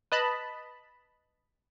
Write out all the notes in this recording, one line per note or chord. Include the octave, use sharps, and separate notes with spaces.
B4 D#5 A5 B5